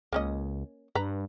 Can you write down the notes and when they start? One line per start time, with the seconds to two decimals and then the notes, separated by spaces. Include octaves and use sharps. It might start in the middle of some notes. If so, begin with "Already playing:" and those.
0.13 C#2 A#3 C#4 D#5
0.95 G2 B4 A#5